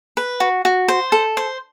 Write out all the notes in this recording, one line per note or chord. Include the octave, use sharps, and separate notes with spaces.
B4
F#4
F#4
C5
A4
C5